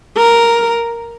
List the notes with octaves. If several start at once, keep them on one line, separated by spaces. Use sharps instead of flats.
A#4